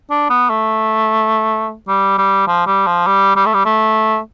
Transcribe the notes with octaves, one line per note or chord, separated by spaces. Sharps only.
D4
B3
A3
G3
G3
F3
G3
F3
G3
G3
A3
G3
A3